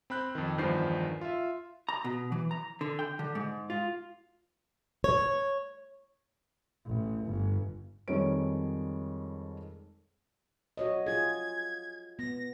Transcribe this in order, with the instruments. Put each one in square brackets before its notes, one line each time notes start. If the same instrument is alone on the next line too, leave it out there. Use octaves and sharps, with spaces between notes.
[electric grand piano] C4 B5 F#6 G6
F2 D#3
E2 G2 D#3 F3 C5 C7
F4 E5
[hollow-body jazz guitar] A#5
B2
E3
A#5
D3
G5
D3
G#2
F4
[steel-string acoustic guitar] C#5
[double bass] A1
G1
[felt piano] F2 D#3 G3 G#3 C#5 D7
[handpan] F#4 C#5 D#5
[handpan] F4 G#4 [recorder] G#6
[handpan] B3 [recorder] A#6